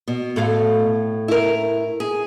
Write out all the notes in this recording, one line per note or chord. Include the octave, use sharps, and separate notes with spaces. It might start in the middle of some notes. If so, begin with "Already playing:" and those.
B2
A2 A4 F5
E4 A#4
G#4